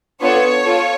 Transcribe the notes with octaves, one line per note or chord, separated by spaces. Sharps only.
B3 D4 F4 A4 C#5
F4 A4